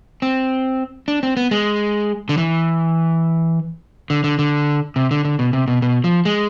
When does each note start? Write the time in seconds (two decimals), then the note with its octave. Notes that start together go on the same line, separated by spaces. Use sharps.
0.22 C4
1.08 D4
1.23 C4
1.37 B3
1.51 G#3
2.29 D3
2.38 E3
4.10 D3
4.24 D3
4.39 D3
4.96 C3
5.11 D3
5.25 D3
5.39 B2
5.53 C3
5.68 B2
5.82 B2
6.04 F3
6.25 G#3